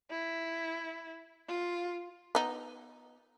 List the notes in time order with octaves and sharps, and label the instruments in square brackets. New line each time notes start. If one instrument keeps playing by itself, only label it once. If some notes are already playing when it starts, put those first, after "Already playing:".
[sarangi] E4
F4
[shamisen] B3 D#4